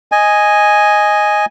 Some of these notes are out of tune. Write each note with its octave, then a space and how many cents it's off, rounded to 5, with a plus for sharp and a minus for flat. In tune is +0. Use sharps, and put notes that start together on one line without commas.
D#5 +0 G#5 +0